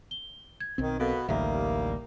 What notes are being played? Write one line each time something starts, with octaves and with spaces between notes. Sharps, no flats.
G7
G#6
B1 D#3 C4
B2 B3 A4 A#4 F5
A1 D2 D#3 G3 A#3 G4 E5 F5